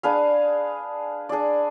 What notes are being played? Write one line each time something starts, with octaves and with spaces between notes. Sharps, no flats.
D4 G#4 B4 F5
D4 G#4 D5